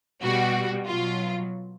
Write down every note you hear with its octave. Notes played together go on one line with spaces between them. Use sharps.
B2 G3 F#4
B2 F#3 F4